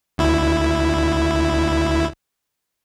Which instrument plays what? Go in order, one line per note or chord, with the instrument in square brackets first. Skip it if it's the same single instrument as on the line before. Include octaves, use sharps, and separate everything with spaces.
[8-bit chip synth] D2 E4